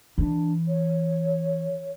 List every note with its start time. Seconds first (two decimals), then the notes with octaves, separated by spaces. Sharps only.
0.18 E3 D4
0.68 C#5